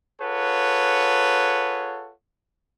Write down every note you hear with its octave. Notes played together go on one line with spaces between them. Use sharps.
F4 G#4 A4 B4 C#5 F#5